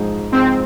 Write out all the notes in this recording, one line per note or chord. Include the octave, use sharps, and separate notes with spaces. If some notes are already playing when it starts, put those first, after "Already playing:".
Already playing: G#2 F3 G#3 D#4
G#2 F3 G#3 C4 D#4